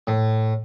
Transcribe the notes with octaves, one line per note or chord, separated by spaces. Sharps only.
A2